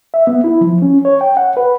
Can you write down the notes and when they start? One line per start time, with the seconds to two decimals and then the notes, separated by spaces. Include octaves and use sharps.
0.14 E5
0.27 B3
0.44 E4
0.61 F3
0.82 C#4
1.05 C#5
1.21 G5
1.37 F#5
1.57 B4